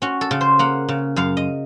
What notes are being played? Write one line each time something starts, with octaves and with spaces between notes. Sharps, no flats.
C#4 F#4
A4
C#3
C5
A#3 F#5
C#3
F#2 F5
D#5